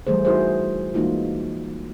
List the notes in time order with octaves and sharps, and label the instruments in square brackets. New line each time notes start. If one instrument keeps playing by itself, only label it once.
[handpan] E3 G3 A3 G#4 C5
D#4 E4 F#4 G#4 A#4 C5
E3 G#3 A#3 D#4 F4 F#4